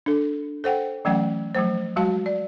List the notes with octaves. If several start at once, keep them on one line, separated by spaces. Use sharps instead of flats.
D4 A4
A4 C5 F#5 G5
E3 F#3 A3 C#4 F#5 G5
F3 F#3 A3 C5
F#3 G#3 F#4 F5 A5
D5